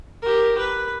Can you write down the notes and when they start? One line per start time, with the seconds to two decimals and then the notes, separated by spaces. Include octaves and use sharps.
0.22 G4 A#4
0.59 B4